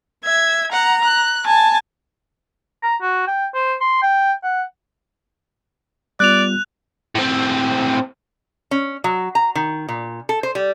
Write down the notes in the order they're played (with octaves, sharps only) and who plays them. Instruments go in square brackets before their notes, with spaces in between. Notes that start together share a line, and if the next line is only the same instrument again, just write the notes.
[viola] E5 [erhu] G#6
[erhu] F#5 [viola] A#5
[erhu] F#6
[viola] G#5 [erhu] A5
[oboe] A#5
F#4
G5
C5
C6
G5
F#5
[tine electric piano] G3 B3 F4 [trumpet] D5 [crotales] F#6 F7
[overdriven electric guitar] A2 C4
[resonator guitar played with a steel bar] C#4
F#3
A#5
D#3
A#2
A4
C5
G3